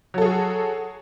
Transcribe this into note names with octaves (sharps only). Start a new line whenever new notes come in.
F#3 F#4 G#4 A4